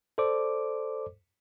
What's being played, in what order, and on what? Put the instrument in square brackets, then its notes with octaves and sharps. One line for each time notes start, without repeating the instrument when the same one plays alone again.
[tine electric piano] A4 C5 D5 D6